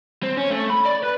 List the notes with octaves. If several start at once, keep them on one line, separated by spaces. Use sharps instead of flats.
C4
C#4
A3
B5
D5
B4